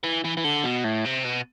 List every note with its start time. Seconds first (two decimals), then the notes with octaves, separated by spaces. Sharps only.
0.03 E3
0.24 E3
0.37 E3
0.44 D3
0.64 B2
0.84 A2
1.05 C3
1.24 B2